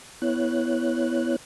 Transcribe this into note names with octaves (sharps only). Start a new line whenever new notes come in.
B3 E4 C#5 F#6